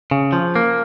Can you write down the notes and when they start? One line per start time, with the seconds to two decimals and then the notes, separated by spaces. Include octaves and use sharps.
0.11 C#3
0.33 F3
0.56 A#3